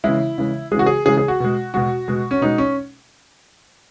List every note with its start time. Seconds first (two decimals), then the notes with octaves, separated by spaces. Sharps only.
0.04 C#3 E3 G#3 E4
0.38 C#3 E3 G#3
0.72 G#3 G#4
0.74 C#3 E3 F#4
0.86 G#4
1.06 C#3 E3 G#3 G#4
1.17 G#4
1.28 F#4
1.40 B2 G#3
1.74 B2 G#3 F#4
2.08 B2 G#3
2.31 C#4
2.41 B2 G#3 D#4
2.58 C#4